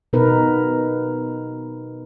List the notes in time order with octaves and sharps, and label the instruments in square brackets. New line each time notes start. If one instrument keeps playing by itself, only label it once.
[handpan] B2 B3 D#4 A#4 B4